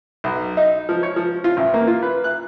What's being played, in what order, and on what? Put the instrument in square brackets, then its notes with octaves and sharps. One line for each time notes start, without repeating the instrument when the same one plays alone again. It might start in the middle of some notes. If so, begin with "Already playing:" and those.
[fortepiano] B1
D#4
F3
C#5
F3
F4
A1
A#3
F4
B4
F#6